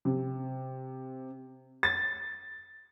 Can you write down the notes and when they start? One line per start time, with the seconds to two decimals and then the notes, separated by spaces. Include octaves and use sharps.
0.05 C3
1.83 A6